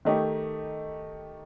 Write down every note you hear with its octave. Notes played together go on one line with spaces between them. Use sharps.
D#3 A3 D#4 G4